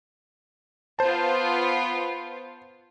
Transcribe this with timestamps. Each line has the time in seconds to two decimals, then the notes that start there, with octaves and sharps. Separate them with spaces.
0.99 B3 F4 C5 A5